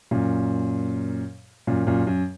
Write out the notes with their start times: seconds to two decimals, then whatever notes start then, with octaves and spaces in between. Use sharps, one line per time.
0.11 F#2 A#2
1.67 F#2 A#2
1.87 F#2 A#2
2.07 F#2